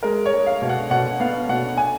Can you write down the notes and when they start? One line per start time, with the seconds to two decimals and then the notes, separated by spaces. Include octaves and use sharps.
0.03 G#3 A#4
0.26 C#5
0.33 G#3
0.47 F5
0.62 B2
0.69 F#5
0.91 B2 F#5
1.20 B3 F5
1.49 B2 F#5
1.78 G#5